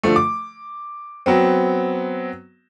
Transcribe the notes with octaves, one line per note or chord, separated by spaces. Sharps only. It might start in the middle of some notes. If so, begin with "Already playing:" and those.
D3 F3 A3
D6
F#3 B3 C4